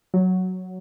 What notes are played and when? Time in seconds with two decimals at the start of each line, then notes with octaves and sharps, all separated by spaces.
0.14 F#3